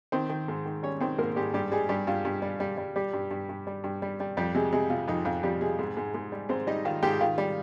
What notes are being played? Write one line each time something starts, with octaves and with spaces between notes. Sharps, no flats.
D#3 C4 C5
D#3
G#2
D#3
G3 C#4 C#5
D#3 C4 C5
G#2 A#3 A#4
G#2 G3 G4
G2 G3 G4
G3 G#3 G#4
G2 G3 G4
G2 F4
G2
G3
G3
G3
G3 G4
G2
G2
G2
G3
G2
G3
G3
F2 G3 G4
C3 G#3 G#4
C3 G#3 G#4
C3 F4
F2 D#4
F2 F4
F2 G3 G4
C3 G#3 G#4
G#2
G#2
G#2
G3
G#2 C4 C5
G3 D#4 D#5
D#3 F4 F5
G#2 G4 G5
D#3 F4 F5
G3